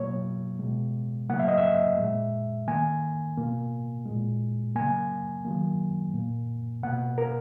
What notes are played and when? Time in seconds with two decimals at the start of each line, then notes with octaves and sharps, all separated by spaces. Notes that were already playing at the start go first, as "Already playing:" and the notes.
Already playing: B2 F#3 A#3 C#5
0.59 B2 G#3
1.29 C#3 F#3 A#3 F#5
1.39 E5
1.48 D#5
1.58 E5
1.98 A#2 G#3
2.67 D#3 A#3 G#5
3.37 B2 A#3
4.06 G#3
4.11 A#2
4.75 C#3 F#3 A#3 G#5
5.45 D#3 F#3 A#3
6.14 A#2 A#3
6.83 B2 A#3 F#5
7.18 A#4